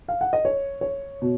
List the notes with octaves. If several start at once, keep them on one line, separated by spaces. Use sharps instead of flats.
F5
F#5
D#5
C#5
C#5
B2